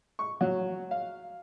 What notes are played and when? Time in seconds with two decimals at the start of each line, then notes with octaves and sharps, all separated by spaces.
0.19 C#6
0.41 F#3
0.91 F5